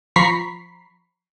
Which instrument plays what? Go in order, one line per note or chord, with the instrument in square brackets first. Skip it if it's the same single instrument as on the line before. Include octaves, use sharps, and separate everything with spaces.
[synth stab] F3 A#5 B5 C#6 B6 C7